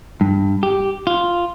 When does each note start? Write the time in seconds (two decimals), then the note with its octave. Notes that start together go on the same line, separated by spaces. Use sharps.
0.21 G2
0.63 G4
1.07 F4